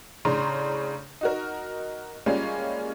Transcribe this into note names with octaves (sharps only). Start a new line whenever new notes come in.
A2 C#3 D4 A#5 C6
D#4 F#4 A#4
G3 G#3 A#3 C#4 F4